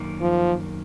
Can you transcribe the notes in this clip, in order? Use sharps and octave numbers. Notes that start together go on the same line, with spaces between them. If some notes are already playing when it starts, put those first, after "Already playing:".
Already playing: F#2 D#3 A#3
F3